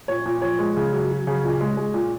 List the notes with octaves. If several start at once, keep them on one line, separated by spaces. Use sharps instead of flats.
A#2 C#5
A#2
F3 C#5
G#3
C#3
F#3
F#3
C#3
A#2
G#3
G#3
A#2